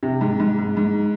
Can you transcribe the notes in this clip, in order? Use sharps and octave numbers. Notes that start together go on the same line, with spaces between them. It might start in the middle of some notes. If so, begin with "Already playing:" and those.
C3
G#2
G#2
G#2
G#2